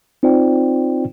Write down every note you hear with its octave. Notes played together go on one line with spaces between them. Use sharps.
C4 D#4 F4 C5 D5 G5